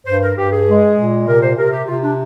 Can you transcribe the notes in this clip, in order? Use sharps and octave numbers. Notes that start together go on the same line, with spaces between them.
G2 C5
A#4
G2 G4
G#4
G#3
A#2
C3 A#4
C5
C3 A#4
G4
C3 F4
D4